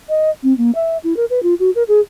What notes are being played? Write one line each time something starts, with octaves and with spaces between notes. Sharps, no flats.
D#5
C4
A#3
E5
E4
A#4
B4
F4
F#4
A#4
G#4